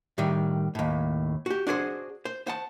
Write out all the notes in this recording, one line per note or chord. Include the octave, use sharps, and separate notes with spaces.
A2 D#3 G3
D#2 A2
F#4 G4
D4 F#4 G#4 C5
C5
C5 F#5 A5